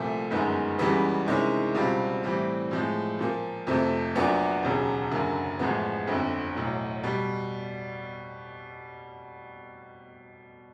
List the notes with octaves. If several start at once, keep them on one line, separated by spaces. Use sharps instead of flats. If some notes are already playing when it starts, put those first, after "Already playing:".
Already playing: C2 A#2 F3 A3
G1 F#2 D#3 G#3 B3
C#2 C#3 E3 G3 B3
C3 D#3 G#3 C#4 E4
C#2 B2 G3 C4 F4
A2 E3 G3 C4
A2 F3 G#3
A#2 F3 A#3
F2 C3 F3 A3
A#1 A#2 F#3 B3 D4
E1 D#2 C#3 F#3
F#1 F#2 D3 F#3 A#3
A1 A2 F3 G#3 B3
G1 F2 D3
B1 A2 F#3
B2 G3